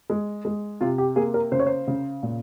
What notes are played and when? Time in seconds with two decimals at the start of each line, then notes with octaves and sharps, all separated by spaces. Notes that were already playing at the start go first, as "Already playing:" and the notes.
0.10 G#3
0.45 G#3
0.81 C3 F4
0.98 G4
1.16 A#3 G#4
1.34 A#4
1.52 C#3 C5
1.59 C#5
1.66 C5
1.87 C#3
2.23 A#2